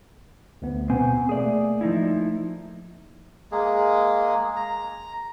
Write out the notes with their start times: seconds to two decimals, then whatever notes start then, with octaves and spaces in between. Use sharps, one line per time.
0.62 D2 B3
0.90 B2 B3 C4 G#5
1.29 A3 A#3 G#4 D5
1.81 F3 D#4 E4
3.52 G#3 A#3 G#4
4.56 A#5